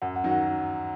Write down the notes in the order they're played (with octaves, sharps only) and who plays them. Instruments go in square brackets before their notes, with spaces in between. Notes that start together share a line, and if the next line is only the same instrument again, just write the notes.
[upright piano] F#2 [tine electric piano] F#5
[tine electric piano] F#5
[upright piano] D#3 F#3
[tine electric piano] F#5